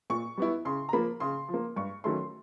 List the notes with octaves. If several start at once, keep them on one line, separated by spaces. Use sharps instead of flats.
A#2 C#6
G3 B3 E4
C#3 C6
A#5
F3 A#3 B5
C#3 C6
F3
A#3
G2 C#6
D#3 F#3 A3 C#4 C6